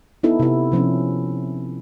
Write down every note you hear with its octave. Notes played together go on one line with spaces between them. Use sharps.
B3 D#4 E4 A4
C3 E4
C3 F3 C4 C#4